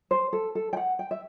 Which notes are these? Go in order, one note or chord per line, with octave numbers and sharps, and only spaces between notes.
C5
A4
A4
G5
F#5
G5
E5